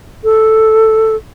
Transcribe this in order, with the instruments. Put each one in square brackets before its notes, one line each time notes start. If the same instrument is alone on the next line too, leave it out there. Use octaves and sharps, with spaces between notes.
[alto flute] A4